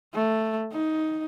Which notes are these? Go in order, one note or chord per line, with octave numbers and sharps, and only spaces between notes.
A3
D#4